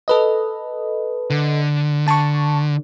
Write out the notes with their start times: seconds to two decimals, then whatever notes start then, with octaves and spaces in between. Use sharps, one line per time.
0.08 A4 B4 D#5
1.30 D3
2.08 D3 A5 C#6